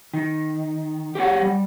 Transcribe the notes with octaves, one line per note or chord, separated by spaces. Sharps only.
D#3
G4 G#4 C#5 F#5
G3